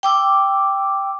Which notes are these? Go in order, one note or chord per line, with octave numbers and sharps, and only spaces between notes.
G5 D6 E6